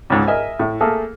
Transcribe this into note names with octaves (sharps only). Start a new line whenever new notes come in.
C#2 G#2
A#4 D#5 E5 G#5
A2
A3 A#3 G#4 A4